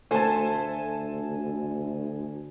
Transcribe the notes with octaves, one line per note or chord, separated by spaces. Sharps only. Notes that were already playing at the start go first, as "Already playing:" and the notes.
D2 A3 A4 C5 G#5 A5